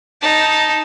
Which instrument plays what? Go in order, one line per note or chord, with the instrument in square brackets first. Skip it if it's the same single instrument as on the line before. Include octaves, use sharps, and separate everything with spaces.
[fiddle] D#4 A5